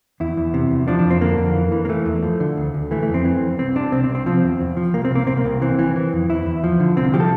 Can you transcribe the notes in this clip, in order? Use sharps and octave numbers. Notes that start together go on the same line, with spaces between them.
E2 E4
E2
C3
E2
F3 D4
D4
F2
C4
D3 A#3
F2
E3
E3
A#3
E3 A3
E2
F3
D3
D2
D2
E3 A3
A3
F2
C4
E3
F2
C2 C4
C3 D4
C2 C4
C4
C2
C4
F3 C4
E2
E2
F3
C2 A#3
C4
C2 A#3
C2 C4
A#3
C2
E3 C4
E3
E3
F2
E2 E4
E2
F3
D3
C2 C4
F3 G4
A4